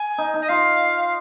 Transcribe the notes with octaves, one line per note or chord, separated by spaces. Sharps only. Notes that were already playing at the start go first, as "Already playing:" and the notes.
Already playing: G#5
D#4
D#4
D#5
F4 F5